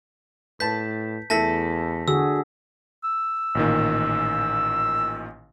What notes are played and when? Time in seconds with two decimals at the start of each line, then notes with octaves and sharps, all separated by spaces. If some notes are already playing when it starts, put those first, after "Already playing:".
0.60 A2 B4 A5 G6 B6
1.30 E2 A3 E4 A4 A5 A#6 B6
2.08 D3 F#4 G#4 E6
3.04 E6
3.55 A1 A#2 D#3